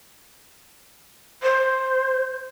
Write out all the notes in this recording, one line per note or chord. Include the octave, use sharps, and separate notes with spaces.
C5